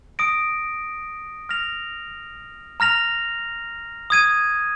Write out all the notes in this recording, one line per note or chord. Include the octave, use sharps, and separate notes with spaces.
D#6 A#6 D7
F6 A#6 F7
A#5 F6 A#6 F7
D#6 G#6 D#7